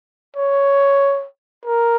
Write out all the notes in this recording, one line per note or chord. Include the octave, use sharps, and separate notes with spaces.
C#5
A#4